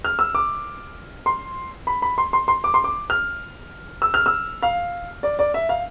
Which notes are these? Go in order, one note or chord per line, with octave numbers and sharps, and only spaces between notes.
F6
E6
D6
C6
B5
B5
C6
C6
C6
D6
C6
D6
F6
E6
F6
E6
F5
D5
D5
E5
F5